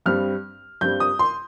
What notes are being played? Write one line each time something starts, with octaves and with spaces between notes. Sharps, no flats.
G2 G3 C4 F6
G2 G3 C4 G6
D#6
C6